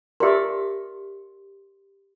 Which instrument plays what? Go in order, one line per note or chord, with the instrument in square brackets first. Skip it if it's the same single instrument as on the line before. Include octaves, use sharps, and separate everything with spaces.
[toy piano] G4 C6 [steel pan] A#4 D5 E5